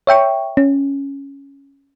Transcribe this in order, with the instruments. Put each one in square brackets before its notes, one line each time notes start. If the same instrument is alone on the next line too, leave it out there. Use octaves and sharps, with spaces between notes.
[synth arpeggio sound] C#5 E5 G5 C#6
C#4